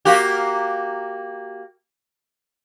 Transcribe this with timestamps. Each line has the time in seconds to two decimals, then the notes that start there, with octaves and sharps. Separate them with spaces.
0.05 A#3 F#4 G4